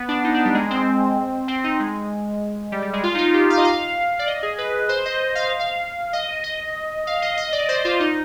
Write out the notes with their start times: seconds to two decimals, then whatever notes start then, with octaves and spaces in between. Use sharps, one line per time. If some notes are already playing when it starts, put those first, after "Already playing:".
Already playing: B3
0.09 D4
0.24 D#4
0.34 D4
0.45 G3
0.54 G#3
0.71 C4
1.48 C4
1.64 D#4
1.80 G#3
2.72 G3
2.83 G3
2.93 G#3
3.03 F4
3.15 D#4
3.18 F4
3.34 G4
3.50 F5
3.58 D#5
3.65 F5
4.19 D5
4.27 D#5
4.43 G#4
4.58 B4
4.89 C5
5.05 D#5
5.35 F5
5.60 F5
6.13 D#5
6.44 D#5
7.07 F5
7.22 D#5
7.38 D#5
7.52 D5
7.69 C5
7.85 F4
8.00 D#4